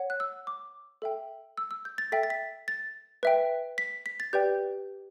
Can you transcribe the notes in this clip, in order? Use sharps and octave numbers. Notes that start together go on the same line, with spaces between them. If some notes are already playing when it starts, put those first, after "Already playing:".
Already playing: C#5 F#5
F#6
E6
D6
A4 E5 G5
E6
E6
G6
A6
A4 E5 G5 B6
A6
B6
A6
B4 E5 G5
B6
B6
A6
G4 B4 D5 G5 G6